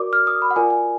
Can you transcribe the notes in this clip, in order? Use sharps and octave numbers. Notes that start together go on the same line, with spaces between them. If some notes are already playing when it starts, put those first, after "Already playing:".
Already playing: F#4 A#4 D5 D6
F6
D#6
B5
F#5
F4 A#4 D5 G#5
G#5